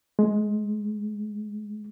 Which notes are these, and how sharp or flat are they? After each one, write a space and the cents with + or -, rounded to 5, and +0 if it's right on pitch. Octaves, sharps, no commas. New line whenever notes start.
G#3 +20